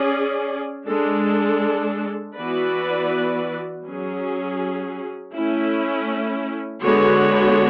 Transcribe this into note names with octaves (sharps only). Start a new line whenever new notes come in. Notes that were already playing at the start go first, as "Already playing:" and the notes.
Already playing: C#4 G#4 D5
G#3 D4 A4
E3 B3 F#4 B4 D5
F#3 C#4 G#4
A3 C#4 E4
D3 G#3 B3 F#4 C#5